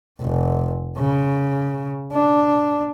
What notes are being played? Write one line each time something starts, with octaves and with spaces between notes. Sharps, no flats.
F1
C#3
D4